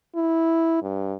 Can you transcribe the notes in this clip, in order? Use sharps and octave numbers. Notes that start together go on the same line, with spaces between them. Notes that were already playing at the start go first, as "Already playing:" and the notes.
E4
G2